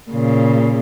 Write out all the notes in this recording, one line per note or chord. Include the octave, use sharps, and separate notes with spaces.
A#2 C#3